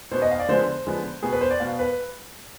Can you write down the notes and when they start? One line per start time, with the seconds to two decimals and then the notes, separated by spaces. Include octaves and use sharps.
0.11 B2 B3 C5
0.22 D#5
0.31 F5
0.39 D5
0.49 D3 F3 G#3 B3 C5
0.87 D3 F3 G#3 B3
1.23 B2 B3 G#4
1.33 B4
1.41 C5
1.51 D5
1.60 B2 B3 F5
1.79 B4